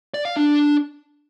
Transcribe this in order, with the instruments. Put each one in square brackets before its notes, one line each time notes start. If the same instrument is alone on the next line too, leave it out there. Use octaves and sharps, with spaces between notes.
[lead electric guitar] D5
F5
D4